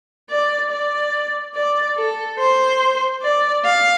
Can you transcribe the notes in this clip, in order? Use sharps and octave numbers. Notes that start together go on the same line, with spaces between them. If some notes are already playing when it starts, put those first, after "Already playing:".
D5
D5
D5
A4
C5
D5
F5